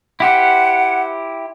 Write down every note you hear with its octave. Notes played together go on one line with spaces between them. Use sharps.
E4 G4 C5 F#5